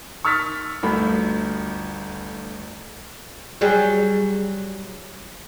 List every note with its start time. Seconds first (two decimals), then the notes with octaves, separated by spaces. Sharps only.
0.25 C#6 E6 F6 A6 B6
0.83 G1 D2 A3 B5
3.61 F#3 G3 G#4